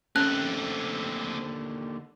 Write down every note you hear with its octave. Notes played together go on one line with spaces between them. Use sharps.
D#2 D3 A3 C4 C#4 F#6